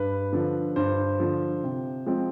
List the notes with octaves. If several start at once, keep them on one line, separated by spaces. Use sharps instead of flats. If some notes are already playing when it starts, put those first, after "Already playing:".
Already playing: G2 B4
D3 F3
G2 C5
D3 F3
C3
F3 G#3 C4